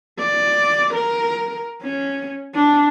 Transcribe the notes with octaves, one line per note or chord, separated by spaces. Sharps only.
D5
A#4
C#4
D4